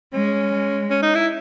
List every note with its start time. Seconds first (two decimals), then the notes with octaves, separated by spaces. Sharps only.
0.14 G#3 C#4
0.52 G#3
0.90 C#4
1.03 D#4
1.15 E4